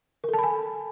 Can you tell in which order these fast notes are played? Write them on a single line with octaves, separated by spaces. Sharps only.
A#4 A4 A5 B5 G#5